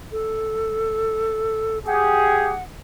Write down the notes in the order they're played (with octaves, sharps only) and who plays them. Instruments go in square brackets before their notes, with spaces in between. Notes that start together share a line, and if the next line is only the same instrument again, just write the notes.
[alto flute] A4
[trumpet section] G4 G#4 [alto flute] F#5